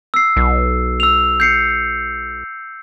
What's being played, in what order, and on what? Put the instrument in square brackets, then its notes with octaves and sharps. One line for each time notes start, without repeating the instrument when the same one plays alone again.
[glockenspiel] E6 C7
[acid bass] B1
[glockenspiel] E6 F7
G6 C7 C#7